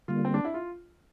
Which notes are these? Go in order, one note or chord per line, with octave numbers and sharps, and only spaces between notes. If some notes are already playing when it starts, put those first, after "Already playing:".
D3 G3 A#3 F4
C4
D4
E4
F4